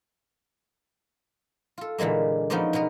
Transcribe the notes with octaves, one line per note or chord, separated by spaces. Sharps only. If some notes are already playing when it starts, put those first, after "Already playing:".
F4 A4
A#2 D3 E3 G#3 A#3
F3 B3 C#4 D#4 C5 D5
B2 G#3 B3 A#4